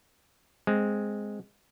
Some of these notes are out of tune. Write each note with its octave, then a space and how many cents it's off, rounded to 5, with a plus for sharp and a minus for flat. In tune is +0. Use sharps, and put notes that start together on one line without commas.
G#3 +0 C4 +0